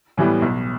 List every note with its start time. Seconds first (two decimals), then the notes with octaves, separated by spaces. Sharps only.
0.17 A2 E3 G3 B3
0.42 B1